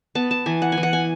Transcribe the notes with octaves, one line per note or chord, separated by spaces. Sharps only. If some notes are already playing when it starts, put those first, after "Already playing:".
B3 A5
A5
E3 G#5
F#5
G#5
E3
F#5
G#5